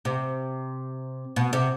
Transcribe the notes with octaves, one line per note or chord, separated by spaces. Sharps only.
C3
B2
C3